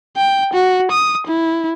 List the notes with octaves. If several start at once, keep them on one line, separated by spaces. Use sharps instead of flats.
G5
F#4
D#6
E4